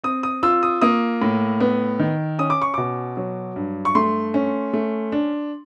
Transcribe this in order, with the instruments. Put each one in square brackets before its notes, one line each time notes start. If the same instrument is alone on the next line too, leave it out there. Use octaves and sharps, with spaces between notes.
[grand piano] C4 D#6
D#6
F4 E6
D#6
A#3 D#6
A2
B3
D#3
C#4 D#6
D6
C#6
B2 D6
F#3
G2
C#6
A3 C6
C#4
A3
D4